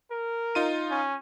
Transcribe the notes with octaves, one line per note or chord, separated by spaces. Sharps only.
A#4
D#4 F4 D#7
C#4